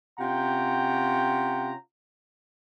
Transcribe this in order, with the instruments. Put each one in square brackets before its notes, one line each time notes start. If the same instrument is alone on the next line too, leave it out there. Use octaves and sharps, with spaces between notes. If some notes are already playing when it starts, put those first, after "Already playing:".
[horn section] C3 C#4 F4 F#5 G5 A#5